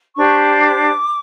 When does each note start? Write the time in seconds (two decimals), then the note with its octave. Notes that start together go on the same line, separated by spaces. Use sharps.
0.16 D4 G4 C5 C#6
0.40 D6
0.62 D6